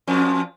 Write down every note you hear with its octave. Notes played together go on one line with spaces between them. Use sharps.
F2 F3